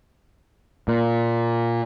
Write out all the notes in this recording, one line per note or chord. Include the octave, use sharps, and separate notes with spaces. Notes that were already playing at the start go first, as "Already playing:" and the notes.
A#2